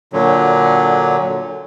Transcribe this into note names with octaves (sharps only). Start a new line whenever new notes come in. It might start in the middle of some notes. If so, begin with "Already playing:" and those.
A#2 D3 F#3